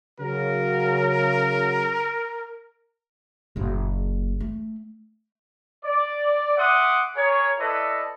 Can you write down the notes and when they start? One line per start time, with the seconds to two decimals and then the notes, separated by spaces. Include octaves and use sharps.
0.20 C#3 F#3 A#4
3.56 F#1 A#2
4.40 A3
5.85 D5
6.58 E5 F#5 C6 D6 D#6
7.16 G#4 A#4 C#5
7.59 E4 A4 B4 D5 D#5